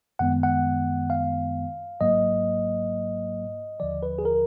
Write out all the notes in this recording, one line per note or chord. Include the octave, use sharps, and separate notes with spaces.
F#2 D#3 G#3 B3 F#5
F#5
F5
G#1 G#2 F#3 A#3 D#5
D#2 D3 F3 D5
B4
G#4
A#4